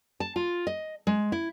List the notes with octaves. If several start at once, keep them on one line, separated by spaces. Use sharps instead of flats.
A5
F4
D#5
G#3
E4